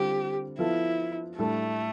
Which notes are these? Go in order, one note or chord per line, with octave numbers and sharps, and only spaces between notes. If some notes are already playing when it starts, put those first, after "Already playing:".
Already playing: D3 G3 C4 F4 G4
F3 B3 E4 F4 A4
A2 G3 A3 D4 A4